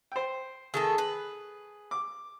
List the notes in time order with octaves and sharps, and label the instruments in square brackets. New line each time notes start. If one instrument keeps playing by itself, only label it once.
[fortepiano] C5 G5
[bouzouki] D#3 A3 A4 [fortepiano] G#4
[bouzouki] B4
[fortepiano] D6